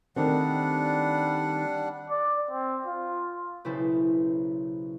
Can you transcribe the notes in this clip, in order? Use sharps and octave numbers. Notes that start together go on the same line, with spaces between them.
D#3 G3 A3 C4 D4 F#5
D5
C4
F4
B1 C#3 E4 A4 C5